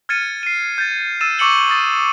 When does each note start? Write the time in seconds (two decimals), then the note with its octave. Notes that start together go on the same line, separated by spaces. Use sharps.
0.09 F6 G#6 A6 C#7 D#7
0.43 C7 D#7
0.78 G6 A6
1.21 E6 A6 D#7 E7
1.39 C#6 D6 E6 C#7 F#7 G7
1.69 D#6 A6 D#7